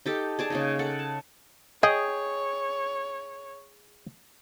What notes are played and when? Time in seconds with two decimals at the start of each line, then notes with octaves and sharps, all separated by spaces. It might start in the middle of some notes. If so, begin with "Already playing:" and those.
0.06 D#4 G4 A4
0.39 G#4 D5 A5
0.50 C#3 A#3 D#4
0.79 A4 F#5
0.99 A5
1.83 G#4 C#5 D#5 G5